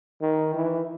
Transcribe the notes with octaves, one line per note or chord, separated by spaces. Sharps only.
D#3
E3